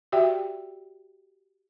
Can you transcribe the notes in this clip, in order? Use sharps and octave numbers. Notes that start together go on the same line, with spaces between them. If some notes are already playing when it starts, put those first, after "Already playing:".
F#4 G4 D5 E5 G5